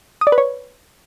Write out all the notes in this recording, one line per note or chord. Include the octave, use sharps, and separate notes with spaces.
D#6
D5
B4
C#5